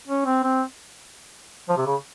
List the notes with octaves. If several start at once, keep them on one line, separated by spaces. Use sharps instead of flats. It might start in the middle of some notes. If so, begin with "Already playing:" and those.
C#4
C4
C4
F3
C3
C#3